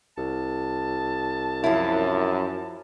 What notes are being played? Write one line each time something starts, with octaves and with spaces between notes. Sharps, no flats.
C2 A5
F#2 F3 E4